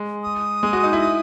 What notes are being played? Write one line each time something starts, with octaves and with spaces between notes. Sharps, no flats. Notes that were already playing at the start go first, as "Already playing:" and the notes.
Already playing: G#3
D#6
G#3
F#4
D#4
E4